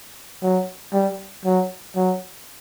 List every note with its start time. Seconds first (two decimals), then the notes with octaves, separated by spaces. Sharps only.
0.42 F#3
0.93 G3
1.45 F#3
1.96 F#3